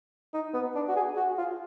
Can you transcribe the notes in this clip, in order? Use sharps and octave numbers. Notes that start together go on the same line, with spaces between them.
D#4
B3
D4
F#4
G#4
F#4
F4